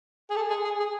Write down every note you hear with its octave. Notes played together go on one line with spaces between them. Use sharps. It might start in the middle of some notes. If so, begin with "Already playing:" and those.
G#4
A4
G#4
G#4
G#4